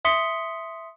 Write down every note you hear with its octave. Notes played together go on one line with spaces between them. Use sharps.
E5 C6 D#6 B6 C#7 G7